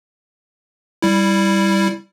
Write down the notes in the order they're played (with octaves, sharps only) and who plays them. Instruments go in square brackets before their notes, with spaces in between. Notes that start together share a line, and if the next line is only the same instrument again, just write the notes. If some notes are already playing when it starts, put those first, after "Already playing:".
[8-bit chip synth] G3 E4